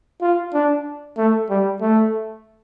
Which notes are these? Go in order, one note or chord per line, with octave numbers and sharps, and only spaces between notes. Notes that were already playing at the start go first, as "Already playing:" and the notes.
F4
D4
A3
G3
A3